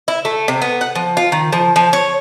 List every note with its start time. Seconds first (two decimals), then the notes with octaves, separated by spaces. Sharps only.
0.08 E4
0.25 A3
0.48 C3
0.62 B3
0.81 F#5
0.95 F3
1.17 F4
1.32 D#3
1.52 F3
1.76 F3
1.93 C#5